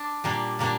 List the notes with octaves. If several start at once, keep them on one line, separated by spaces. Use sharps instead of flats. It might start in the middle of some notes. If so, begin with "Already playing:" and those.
Already playing: D4
A#2 G3 A#3 D4
A#2 G3 A#3 D4